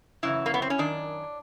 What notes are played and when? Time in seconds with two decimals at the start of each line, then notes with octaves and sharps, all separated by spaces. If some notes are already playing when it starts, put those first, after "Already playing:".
0.23 F#2 C#3 E3 E4
0.46 A#3
0.54 B3
0.62 C4
0.70 C#4
0.78 F#2 D#3 D4